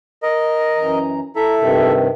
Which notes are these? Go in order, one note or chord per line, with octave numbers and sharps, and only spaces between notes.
A#4 D#5
F#2 E3 A#5
E4 A4 E5 A#5
G2 C3 D#3